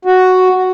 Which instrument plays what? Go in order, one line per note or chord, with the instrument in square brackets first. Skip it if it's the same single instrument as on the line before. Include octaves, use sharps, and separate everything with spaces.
[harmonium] F#4